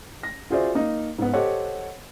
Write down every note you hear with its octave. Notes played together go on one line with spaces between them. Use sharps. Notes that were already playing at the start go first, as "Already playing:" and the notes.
A#6
F4 F#4 G#4 C5 D5 E5
A#3 D#4
G#2 B3
G4 A4 C5 C#5 D#5 F#5